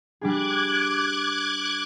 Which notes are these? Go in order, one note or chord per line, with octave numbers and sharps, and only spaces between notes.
G3 D4 G#4 D6 F#6 G#6